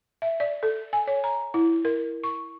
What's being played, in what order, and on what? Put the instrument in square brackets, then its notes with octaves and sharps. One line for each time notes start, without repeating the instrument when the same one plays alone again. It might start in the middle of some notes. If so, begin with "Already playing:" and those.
[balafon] E5
D5
A4
G#5
C#5
A#5
E4
A#4
C#6